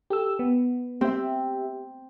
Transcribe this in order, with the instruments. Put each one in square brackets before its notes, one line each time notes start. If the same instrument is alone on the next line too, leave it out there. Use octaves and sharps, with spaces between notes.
[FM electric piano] G4 A4 E6
B3
[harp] C4 [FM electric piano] G4 E5